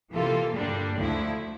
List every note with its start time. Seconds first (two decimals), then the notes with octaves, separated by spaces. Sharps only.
0.12 C3 E3 A#3 F4 A4
0.54 G2 D3 G3 A#3 D4
0.95 D2 D3 F3 A3 E4